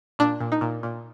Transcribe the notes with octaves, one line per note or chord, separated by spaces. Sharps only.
A#2 D4
A#2
D#4
A#2
A#2